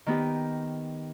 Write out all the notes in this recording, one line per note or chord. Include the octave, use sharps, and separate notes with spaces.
D#3 B3 G4